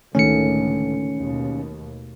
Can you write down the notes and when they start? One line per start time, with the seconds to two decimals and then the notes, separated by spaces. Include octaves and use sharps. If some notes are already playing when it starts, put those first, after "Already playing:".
0.15 C#2 A2 D3 D#3 A3 C#4 C#7
1.17 D#2 B2